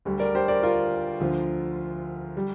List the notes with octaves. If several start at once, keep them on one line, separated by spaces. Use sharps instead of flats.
D2 D3 G3
A#4 D5
G4 C5
A#4 D5
F4 A#4
D2 D3 F3
G3